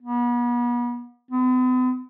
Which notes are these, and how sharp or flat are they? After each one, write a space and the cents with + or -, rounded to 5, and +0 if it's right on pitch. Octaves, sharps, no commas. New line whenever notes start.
B3 -40
B3 +45